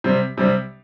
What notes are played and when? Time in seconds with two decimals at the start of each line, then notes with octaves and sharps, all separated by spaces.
0.04 C3 G3 C4
0.38 C3 G3 C4